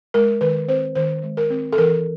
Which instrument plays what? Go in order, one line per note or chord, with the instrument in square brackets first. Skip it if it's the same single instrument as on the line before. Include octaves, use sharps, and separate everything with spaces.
[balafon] G#3 A#4
D#3 B4
C4 C5
D#3 C5
G#3
A#4
C4
A4
E3 A#4